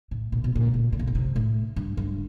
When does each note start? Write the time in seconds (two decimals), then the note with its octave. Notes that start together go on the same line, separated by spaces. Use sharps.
0.11 A2
0.32 A#2
0.44 B2
0.55 A#2
0.74 A#2
0.92 A2
0.99 A#2
1.07 B2
1.15 C3
1.36 A2
1.76 G2
1.97 G2